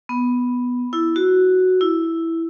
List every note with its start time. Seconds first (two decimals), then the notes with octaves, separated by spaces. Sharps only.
0.09 B3
0.93 E4
1.16 F#4
1.81 E4